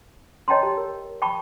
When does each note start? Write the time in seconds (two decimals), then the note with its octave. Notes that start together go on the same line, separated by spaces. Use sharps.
0.48 C#5 D#5 G5 A5 A#5 C6
0.63 G4
0.77 A#4
1.22 G5 A5 B5 C#6